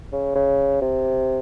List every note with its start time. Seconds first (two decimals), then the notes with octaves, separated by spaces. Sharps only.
0.13 C#3
0.35 C#3
0.82 C3